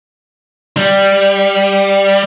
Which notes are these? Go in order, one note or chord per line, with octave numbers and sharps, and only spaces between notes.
G3